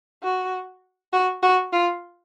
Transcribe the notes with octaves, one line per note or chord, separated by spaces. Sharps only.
F#4
F#4
F#4
F4